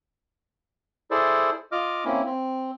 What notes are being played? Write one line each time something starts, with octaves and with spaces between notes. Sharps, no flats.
E4 G#4 A4 C5 D5
F4 D#5 D6 F6
A#3 C4 C#4 E4
C4